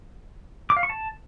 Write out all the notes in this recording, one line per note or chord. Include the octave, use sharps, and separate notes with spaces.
D6
F5
C#6
A5